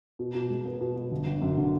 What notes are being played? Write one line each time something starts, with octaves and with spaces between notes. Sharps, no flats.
B2
B2
G#3
B3
B2
B2
G1
G1
F#2
D3